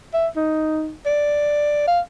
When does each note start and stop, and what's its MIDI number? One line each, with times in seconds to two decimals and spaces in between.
0.14 0.28 76
0.36 0.92 63
1.06 1.87 74
1.88 2.00 77